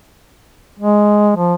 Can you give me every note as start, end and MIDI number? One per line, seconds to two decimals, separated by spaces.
0.79 1.36 56
1.36 1.55 53